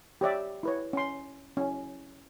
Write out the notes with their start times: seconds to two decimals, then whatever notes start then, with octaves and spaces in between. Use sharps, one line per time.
0.21 G4 C#5 D5 E5
0.63 E4 B4 C#5
0.93 C#4 C6
1.57 C#4 E4